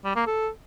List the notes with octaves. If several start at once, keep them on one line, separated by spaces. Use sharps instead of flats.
G3
A#3
A4